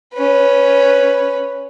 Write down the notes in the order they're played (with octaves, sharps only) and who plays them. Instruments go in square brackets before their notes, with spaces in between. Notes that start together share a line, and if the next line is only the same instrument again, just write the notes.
[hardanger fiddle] C#4 B4